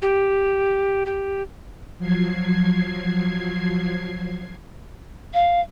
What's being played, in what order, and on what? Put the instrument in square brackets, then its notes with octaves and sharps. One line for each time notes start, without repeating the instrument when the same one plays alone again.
[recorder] G4
G4
[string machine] F3 F#3 G#6 C7
[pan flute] F5